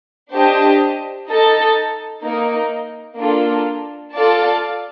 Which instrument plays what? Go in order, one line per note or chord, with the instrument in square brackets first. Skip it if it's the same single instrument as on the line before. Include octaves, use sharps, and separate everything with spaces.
[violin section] D4 G4 C5 D#5 A5
D#4 A4 D#5 A5
A#3 D#4 A#4
A#3 D4 F4 A4
F4 A4 D5 F5 A5